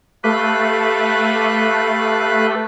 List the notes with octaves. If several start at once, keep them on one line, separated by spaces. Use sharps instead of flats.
A3 G4 B4 F5 B5 F#6